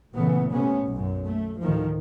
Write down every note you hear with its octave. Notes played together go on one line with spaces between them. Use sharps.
A#2 C#3 E3 A3 B3
C3 A3 B3 C#4
B1 F#2
A3
D2 A2 D#3 F3